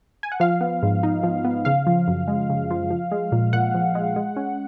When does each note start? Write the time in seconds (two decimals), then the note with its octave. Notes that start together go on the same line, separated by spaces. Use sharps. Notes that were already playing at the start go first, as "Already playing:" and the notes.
0.23 G#5
0.32 F#5
0.40 F3 F5
0.61 B3
0.83 G#2
1.03 D#4
1.23 F3
1.45 B3
1.65 C#3 F5
1.87 F3
2.08 F#2
2.28 G#3
2.50 C#3
2.71 F3
2.90 F3
3.12 G#3
3.32 A#2
3.53 A#2 F#5
3.75 F3
3.95 G#3
4.16 G#3
4.37 C#4